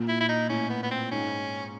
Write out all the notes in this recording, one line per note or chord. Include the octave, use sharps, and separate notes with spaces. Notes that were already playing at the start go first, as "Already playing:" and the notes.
Already playing: A#2
E4
E4
D#4
A2 C#4
B3
B3
C4
G#2 C#4